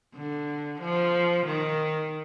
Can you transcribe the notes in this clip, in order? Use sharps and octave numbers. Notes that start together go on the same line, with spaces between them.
D3
F3
D#3